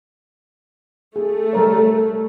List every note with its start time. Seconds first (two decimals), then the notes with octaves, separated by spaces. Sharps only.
1.16 A3 G#4
1.53 G3 A#4 C#5